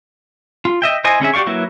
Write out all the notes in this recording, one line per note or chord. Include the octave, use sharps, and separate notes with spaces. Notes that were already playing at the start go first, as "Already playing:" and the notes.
F4
D#5 E5 G5
E4 C5 D#5 G#5
D3 C#4 G#4 E5
F#4 G4 D5 F5 C#6
F#3 A#3 E4 F#4 B4